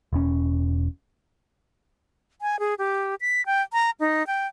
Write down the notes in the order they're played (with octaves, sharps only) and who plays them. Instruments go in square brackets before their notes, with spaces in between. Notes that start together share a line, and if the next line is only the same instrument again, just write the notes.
[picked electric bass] E1 C#4
[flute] G#5
G#4
G4
B6
G5
A#5
D#4
G5